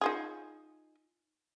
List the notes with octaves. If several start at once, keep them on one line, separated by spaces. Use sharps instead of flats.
D#4 F4 G#4